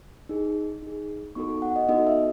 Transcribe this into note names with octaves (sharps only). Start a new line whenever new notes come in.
D#4 G#4
D#4 G#4
B3 D#4 F#4 A4 C#6
F#5
D#5
B3 D#4 F#4 A4 D#5
E5